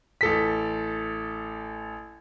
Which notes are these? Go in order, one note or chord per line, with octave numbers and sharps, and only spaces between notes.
A1 A4 B6